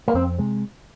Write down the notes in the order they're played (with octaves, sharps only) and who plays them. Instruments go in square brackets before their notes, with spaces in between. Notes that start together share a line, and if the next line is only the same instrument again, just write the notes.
[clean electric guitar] A#3
[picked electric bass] F2 [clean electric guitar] C4
[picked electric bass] C3 G#3